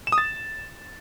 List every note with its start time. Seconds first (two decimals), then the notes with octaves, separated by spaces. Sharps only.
0.07 E7
0.12 D#6
0.18 A6